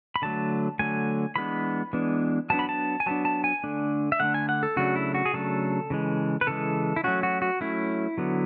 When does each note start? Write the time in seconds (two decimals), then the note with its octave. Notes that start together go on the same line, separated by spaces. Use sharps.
0.16 B5
0.22 D3 F#3 A3 A5
0.79 D3 F#3 A3 G#5
1.36 E3 G#3 B3 D4 B5
1.93 E3 G#3 B3 D4
2.50 F#3 B3 D4 A5
2.59 B5
2.69 A5
3.00 G#5
3.06 F#3 B3 D4 A5
3.25 A5
3.44 G#5
3.63 D3 A3 D4
4.12 E5
4.20 D3 A3 D4 F#5
4.34 G#5
4.49 F#5
4.63 A4
4.77 C#3 F#3 A3 D4 F#4
4.96 E4
5.15 F#4
5.25 G#4
5.34 C#3 F#3 A3 D4 A4
5.90 C#3 E3 G#3
6.41 B4
6.47 C#3 E3 G#3 A4
6.96 E4
7.04 F#3 A3 C#4 F#4
7.23 F#4
7.42 F#4
7.61 F#3 A3 C#4 E4
8.18 D3 F#3 B3